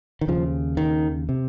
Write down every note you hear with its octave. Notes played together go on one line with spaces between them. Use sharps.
D#3
D#2 C#3 F3
D#3
C3